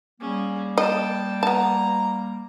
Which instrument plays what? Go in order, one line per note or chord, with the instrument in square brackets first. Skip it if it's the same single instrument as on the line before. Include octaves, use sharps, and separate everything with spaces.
[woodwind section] G3 A#3 [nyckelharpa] C#4 G#4
[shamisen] D#5 [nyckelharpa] G5 A5
[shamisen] B3 A5 [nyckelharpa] A#5